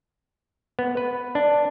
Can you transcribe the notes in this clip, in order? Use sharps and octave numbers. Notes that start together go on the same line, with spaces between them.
B3
B4
D4